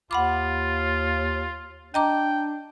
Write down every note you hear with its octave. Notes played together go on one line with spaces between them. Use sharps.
D#2 F4 F#5 B5 D6
D4 D#5 G5 A#5 D6